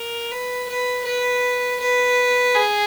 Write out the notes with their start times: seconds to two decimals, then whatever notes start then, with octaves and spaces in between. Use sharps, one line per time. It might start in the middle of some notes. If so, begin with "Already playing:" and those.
Already playing: A#4
0.31 B4
0.68 B4
1.05 B4
1.80 B4
2.55 G#4